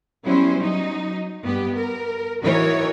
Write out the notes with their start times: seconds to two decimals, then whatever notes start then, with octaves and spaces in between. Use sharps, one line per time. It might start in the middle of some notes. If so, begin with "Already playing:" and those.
0.24 F#3 G3 B3 C#4 E4 C5
0.60 F#3 D#4
1.44 G2 B3 G4
1.74 A#4
2.42 E3 D#4 F#4 A#4 C#5